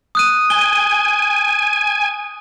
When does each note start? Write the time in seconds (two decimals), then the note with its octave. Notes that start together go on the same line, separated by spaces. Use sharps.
0.15 D#6 F#6 D#7
0.50 G#5 G7